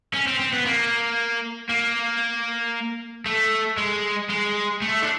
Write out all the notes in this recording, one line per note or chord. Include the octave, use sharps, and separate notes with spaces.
C#4
C4
C4
B3
A#3
A#3
A3
G#3
G#3
A3
D4